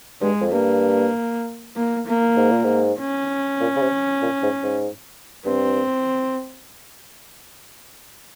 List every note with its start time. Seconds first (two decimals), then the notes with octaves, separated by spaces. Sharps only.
0.21 G2 G#3
0.41 F2
0.52 G2 A#3
1.76 A#3
2.07 A#3
2.37 G#2
2.51 A#2
2.64 G#2
2.99 C#4
3.61 A#2
3.76 C#3
3.81 C3
4.22 A#2
4.43 G#2
4.63 G#2
5.46 G2 C4